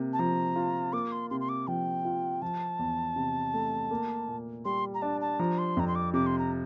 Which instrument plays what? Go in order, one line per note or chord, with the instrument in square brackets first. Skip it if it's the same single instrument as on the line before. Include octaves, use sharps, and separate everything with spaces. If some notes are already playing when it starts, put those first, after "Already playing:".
Already playing: [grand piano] C3 A#3
[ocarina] A5
[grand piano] F3 [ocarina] A#5
[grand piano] F4
[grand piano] A#3 [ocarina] D6
[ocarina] C6
[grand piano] C3 [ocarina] C6
[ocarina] C6
D6
[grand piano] F3 [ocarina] G5
[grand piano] F4
[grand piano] F3 [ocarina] A5
[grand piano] E2
C3
A3
A#3
A#2
[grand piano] G3 [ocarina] C6
[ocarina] A#5
[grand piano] D4 [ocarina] A5
[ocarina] A5
[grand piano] F3 [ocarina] A#5
[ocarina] C6
[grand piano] F2 [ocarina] A#5
[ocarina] C6
D6
[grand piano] C3 [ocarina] D6
[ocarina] C6
A#5